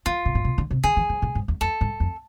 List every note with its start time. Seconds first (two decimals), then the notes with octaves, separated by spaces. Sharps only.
0.06 E3 F4
0.25 B2
0.35 A2
0.45 B2
0.58 D3
0.71 C3
0.84 D3 G#4
0.97 E3
1.09 F3
1.22 A2
1.35 G#2
1.48 E2
1.61 F2 A4
1.81 G#2
2.00 F2